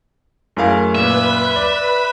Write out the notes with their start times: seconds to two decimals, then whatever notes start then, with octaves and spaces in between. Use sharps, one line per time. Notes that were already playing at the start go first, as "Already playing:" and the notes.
0.57 F#2 A3 E4 G#4 A#4 F5
0.95 A#2 B4 E5 B5
1.56 D5